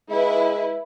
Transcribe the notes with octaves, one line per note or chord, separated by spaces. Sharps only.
G#3 E4 B4